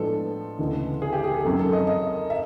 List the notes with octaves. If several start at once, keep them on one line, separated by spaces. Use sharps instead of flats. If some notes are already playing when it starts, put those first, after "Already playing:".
Already playing: A2 F3 G#3 B3 D4 A4
D2 C#3 E3 G#3 B3
G#4
G4
G#4
A4
F#2 D#3 F#3 A#3 C#4
A4
D#5
D#5
E5